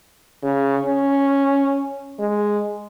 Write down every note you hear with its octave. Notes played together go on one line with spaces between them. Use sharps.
C#3
C#4
G#3